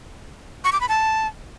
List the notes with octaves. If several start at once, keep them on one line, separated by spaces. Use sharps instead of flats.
C#6
D6
B5
A5